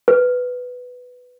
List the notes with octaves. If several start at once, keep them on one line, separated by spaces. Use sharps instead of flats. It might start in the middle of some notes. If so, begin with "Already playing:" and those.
B4